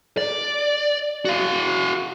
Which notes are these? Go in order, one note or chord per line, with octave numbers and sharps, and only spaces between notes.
D5
F#4 F5